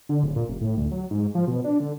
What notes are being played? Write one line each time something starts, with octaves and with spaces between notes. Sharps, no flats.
D3
D1
A#2
F1
A2
D2
F#3
G#2
F3
B2
D4
D3